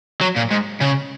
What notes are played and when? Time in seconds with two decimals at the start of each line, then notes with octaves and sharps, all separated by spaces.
0.21 F#3
0.36 A#2
0.51 G#2
0.81 C#3